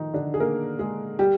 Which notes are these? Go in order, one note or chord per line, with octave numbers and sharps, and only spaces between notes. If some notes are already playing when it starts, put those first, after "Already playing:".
Already playing: D#3 F3 D#4
D3 D4
G#4
A#3 A#4
G#3 G#4
G3 G4